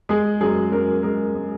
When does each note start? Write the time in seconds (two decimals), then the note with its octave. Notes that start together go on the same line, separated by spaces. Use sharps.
0.09 G#3 G#4
0.41 F#2 G#4
0.72 F#2 A#4
1.03 G#3 A#4
1.35 G#3